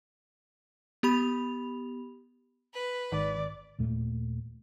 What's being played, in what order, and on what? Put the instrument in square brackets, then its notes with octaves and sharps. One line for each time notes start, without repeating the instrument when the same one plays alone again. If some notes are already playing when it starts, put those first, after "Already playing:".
[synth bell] B3 G4 B5 F7
[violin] B4
[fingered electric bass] G#1 [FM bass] D#3 [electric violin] D5
[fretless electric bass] D#2 A#2 A3